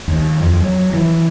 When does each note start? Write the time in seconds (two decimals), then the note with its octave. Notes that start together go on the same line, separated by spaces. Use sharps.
0.08 D#2
0.40 F2
0.62 F#3
0.93 E3